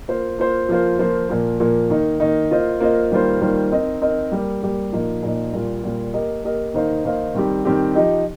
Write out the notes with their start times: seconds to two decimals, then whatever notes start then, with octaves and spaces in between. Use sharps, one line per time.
0.08 A#3 F4 C5
0.39 A#3 F4 C5
0.69 F3 A#3 F4 C5
0.99 F3 A#3 F4 C5
1.29 A#2 F3 A#3
1.60 A#2 F3 A#3
1.90 D#3 A#3 D#4
2.20 D#3 A#3 D#4
2.51 A#3 F4 C5 D#5
2.80 A#3 F4 C5 D#5
3.11 D#3 G3 A#3 F4 C5
3.41 D#3 G3 A#3 F4 C5
3.72 C4 D#4 A#4 D#5
4.01 C4 D#4 A#4 D#5
4.32 G3 A#3 G4
4.63 G3 A#3 G4
4.92 A#2 F3 A#3 D#4
5.23 A#2 F3 A#3 D#4
5.53 A#2 G3 A#3 F4
5.83 A#2 G3 A#3 F4
6.14 A#3 G4 A#4 D#5
6.44 A#3 G4 A#4 D#5
6.74 D#3 A#3 D#4 C5 F5
7.05 D#3 A#3 D#4 C5 F5
7.35 D#3 G3 C4 G4
7.65 D#3 G3 C4 G4
7.95 F3 D#4 G4 D#5